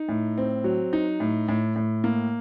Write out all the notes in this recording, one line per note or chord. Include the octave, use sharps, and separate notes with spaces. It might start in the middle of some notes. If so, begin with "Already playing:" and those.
Already playing: D#4
A2
C4
F#3
D#4
A2
A2
A2
A#3